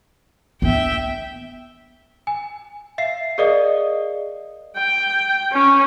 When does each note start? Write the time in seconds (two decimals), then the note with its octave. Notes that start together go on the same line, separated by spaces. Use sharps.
0.62 B3 D4 E5 G5
2.27 G#5
2.98 E5 F5 C7
3.38 G#4 A#4 D5 D#5 F5 D#6
4.77 G5
5.52 C#4